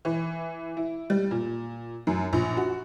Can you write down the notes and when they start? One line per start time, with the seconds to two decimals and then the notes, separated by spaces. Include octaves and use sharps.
0.05 E3
0.77 E4
1.10 G3
1.31 A#2
2.07 F#2
2.33 A#1
2.57 F#4